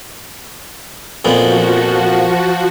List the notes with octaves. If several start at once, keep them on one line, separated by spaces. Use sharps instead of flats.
F2 A#2 F3 B3 F#4